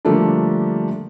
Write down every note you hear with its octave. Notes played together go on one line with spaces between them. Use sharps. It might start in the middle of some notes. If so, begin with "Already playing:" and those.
D3 F3 G3 A3 A#3 D4